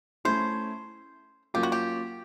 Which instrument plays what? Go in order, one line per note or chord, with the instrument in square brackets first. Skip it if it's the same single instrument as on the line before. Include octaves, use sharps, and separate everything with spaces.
[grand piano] A3 C#4 E4 [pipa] C5
[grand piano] F#3 A#3 C#4 F4 [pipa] G4
[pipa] F#4
G4